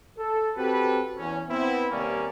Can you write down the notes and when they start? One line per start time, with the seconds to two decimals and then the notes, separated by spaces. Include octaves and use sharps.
0.18 A4
0.55 C4 F#4 G4 A4 B4
1.17 E2 C#4
1.48 B3 C4 E4
1.90 D#2 C3 G3 A#3 C#4 D5